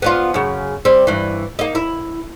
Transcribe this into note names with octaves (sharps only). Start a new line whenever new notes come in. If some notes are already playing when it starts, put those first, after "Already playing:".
B3 D4 F4
F#2 C#3
G3 C4
G2 E3
A#3 D#4
E4